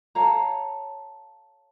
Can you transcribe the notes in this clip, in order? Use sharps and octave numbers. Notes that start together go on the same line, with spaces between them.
A4 C#5 F5 A#5